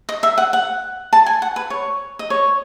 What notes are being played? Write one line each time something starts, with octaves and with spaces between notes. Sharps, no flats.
D#5
E5
F#5
F#5
A5
G#5
F#5
B4
C#5
D#5
C#5